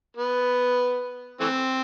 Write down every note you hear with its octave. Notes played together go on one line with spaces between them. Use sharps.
B3
E3 A3 C4